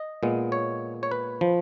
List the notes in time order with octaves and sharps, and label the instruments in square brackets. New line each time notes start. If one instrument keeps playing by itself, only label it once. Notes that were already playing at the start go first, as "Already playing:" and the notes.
Already playing: [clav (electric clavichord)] D#5
A#2 G#3 B3
C#5
C#5
B4
F3